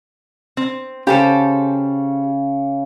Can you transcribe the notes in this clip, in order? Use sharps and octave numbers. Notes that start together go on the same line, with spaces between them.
C4
C#3 G4 A4 C5